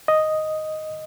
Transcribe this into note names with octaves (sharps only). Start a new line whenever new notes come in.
D#5